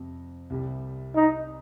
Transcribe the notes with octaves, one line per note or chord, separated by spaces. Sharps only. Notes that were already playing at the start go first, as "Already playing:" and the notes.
Already playing: F2 C3
C2 C3 G3
D#4